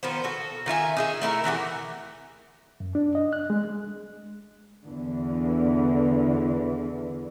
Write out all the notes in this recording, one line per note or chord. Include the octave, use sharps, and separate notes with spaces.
D#3 F3 B3 C5
F#4 A4
D#3 F4 E5 G#5
D#4 G#4 E5
A3 E4 F4 A#4
D#3 E3 F#4 G4
F#2
D4
D#5
F#6
G#3
E2 D3 E3